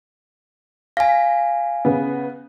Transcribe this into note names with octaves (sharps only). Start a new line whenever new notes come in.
F5 G#5 A#6 B6
C#3 B3